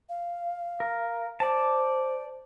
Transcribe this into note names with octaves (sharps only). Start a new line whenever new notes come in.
F5
A#4
C5 D5 A5